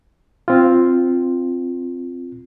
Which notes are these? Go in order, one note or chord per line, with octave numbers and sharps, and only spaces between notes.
C4 F4